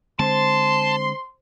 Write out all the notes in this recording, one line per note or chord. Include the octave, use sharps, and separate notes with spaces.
D3 G#3 C4 C5 A5 C6